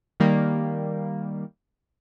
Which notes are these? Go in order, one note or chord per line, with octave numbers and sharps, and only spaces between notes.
D#3 G3 A#3